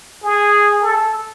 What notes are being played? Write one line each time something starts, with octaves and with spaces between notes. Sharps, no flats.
G#4
A4